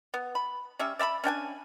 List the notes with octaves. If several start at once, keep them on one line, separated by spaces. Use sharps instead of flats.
B3
B5
G3 C#4 E5
D5 E5 A#5 B5
C#4 D4 G5 G#5